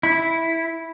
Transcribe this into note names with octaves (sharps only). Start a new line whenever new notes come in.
E4